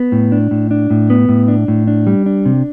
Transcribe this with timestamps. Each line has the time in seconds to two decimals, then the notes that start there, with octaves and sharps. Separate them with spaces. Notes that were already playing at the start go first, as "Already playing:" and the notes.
Already playing: B3
0.12 A2
0.32 D4
0.51 A2
0.71 D4
0.90 A2
1.10 B3
1.29 A2
1.48 D4
1.68 A2
1.87 D4
2.07 G3
2.26 D4
2.46 C3